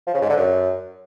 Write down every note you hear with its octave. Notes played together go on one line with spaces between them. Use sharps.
F3
C#3
G#2
D3
F#2